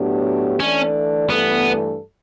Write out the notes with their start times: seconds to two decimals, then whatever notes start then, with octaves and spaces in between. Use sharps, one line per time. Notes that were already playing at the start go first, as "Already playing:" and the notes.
Already playing: A2 F#3 B3 D4 G4
0.60 E3 A3 C#4 D4 A4 D5
1.29 G2 E3 A3 B3 D4 A4